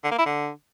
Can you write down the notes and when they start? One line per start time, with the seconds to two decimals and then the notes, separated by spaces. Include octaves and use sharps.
0.04 D3
0.11 A#3
0.18 E4
0.26 D3